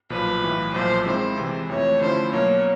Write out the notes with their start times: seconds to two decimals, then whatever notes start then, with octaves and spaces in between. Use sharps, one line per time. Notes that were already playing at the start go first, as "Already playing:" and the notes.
0.10 B1 A#2 F3 B4
0.42 B1 A2 E3
0.74 B1 A#2 F3 C5
1.06 D#3 G#3 C4 E4 C5
1.37 C3 E3 G#3
1.69 F2 C3 E3 A3 C#5
2.01 D3 F3 A3 C#4 E4 C5
2.33 B2 F#3 A#3 C#5